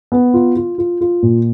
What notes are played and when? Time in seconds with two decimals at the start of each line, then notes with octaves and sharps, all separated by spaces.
0.12 B3
0.34 F4
0.56 F4
0.78 F4
1.01 F4
1.23 A#2